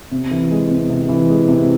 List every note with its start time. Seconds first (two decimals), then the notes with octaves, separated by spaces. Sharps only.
0.11 C3
0.31 E3
0.51 G#3
0.70 C3
0.90 C3
1.09 E3
1.29 G#3
1.48 C3